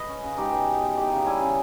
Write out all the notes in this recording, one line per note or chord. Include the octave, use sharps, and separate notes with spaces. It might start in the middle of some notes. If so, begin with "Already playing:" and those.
Already playing: B4 D#5
C#4
C#3
G#3 D#4 G4
B2
B3
B2
E3 D#4 G4
C#3
G3 E4 G#4
C#3